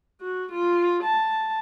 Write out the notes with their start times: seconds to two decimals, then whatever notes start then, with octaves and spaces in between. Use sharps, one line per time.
0.21 F#4
0.52 F4
1.04 A5